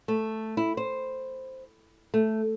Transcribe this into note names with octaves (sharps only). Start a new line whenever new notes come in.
A3
E4
C5
A3